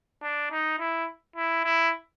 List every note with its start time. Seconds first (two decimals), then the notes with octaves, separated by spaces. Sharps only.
0.22 D4
0.51 D#4
0.79 E4
1.36 E4
1.64 E4